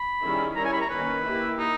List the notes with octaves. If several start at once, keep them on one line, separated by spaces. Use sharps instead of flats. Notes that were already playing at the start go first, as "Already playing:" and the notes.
Already playing: B5
D#3 G3 C#4 E4 G#4
G3 C#4 E4 A#4 C#5 A#5
G#5
B5
A#5
D#3 A#3 C#4 B4
A#3 E4 G4
D#4